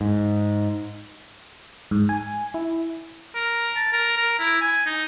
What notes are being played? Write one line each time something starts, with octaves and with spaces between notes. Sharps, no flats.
G#2
G#2
G#5
E4
A#4
A5
A#4
A#4
E4
G#5
D#4